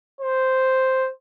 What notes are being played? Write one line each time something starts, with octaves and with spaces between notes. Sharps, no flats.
C5